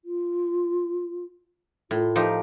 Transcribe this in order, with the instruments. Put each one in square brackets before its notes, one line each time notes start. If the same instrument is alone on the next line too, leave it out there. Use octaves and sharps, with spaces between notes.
[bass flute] F4
[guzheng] A2 [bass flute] F4
[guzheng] F3 D#4 G4